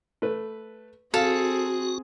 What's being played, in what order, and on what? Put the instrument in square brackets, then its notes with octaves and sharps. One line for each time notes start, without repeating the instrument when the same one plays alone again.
[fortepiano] A3 B4
[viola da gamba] C4 G#4 [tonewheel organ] F#4 [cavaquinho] A4 [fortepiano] F5